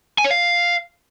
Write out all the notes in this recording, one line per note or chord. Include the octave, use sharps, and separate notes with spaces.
G#5
C#5
F5